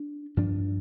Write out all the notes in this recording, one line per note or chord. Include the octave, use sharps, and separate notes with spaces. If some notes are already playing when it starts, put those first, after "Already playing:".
Already playing: D4
G2 F3 D4